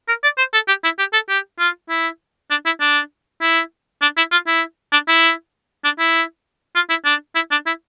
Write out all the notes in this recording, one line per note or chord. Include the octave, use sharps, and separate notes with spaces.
A#4
D5
C5
A4
G4
E4
G4
A4
G4
F4
E4
D4
E4
D4
E4
D4
E4
F4
E4
D4
E4
D4
E4
F4
E4
D4
E4
D4
E4